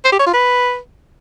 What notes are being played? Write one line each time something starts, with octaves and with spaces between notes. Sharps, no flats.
C5
G4
C#5
F4
B4